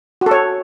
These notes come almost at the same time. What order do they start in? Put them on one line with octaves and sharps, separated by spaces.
F#4 A4 C#5